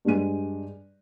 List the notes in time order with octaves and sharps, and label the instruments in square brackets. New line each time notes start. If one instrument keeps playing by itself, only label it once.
[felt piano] G2 G#3 D#7